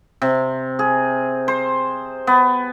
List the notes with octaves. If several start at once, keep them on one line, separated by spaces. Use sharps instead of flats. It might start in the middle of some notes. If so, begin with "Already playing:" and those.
C3
G#4
C5
B3